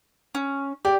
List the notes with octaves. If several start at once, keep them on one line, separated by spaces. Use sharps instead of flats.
C#4
G4 D5